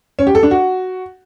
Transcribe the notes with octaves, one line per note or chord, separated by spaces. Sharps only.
C#4
G4
A4
D4
F#4